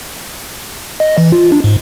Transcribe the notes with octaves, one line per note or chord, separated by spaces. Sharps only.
D#5
E3
F4
D4
G#2